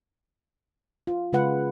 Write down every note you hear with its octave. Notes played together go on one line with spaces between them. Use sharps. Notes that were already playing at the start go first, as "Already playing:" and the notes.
F4
C#3 G#3 F4 B4 F#5